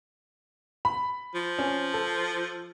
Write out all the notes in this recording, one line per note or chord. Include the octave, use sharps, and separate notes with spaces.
B5
F3
C#4
A4